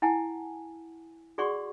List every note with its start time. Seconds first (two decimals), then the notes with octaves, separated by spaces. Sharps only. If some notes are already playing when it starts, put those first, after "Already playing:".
0.02 E4 F#5 G#5 A5
1.38 F#4 G#4 D5 F#5 C6 C#6